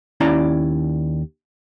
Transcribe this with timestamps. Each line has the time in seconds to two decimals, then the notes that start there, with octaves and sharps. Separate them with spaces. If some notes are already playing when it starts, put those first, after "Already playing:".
0.20 D#2 C#4 E4 D5 A#5